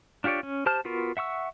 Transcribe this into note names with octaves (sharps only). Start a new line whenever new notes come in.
D4 F4 G4 C#5 D5
C#4
G4 C5 A5 F6
B3 F4 F#4 A#4
E5 F#5 C#6 E6